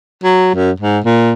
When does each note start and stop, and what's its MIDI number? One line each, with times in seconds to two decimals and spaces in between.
0.23 0.53 54
0.55 0.71 42
0.80 0.99 44
1.04 1.33 46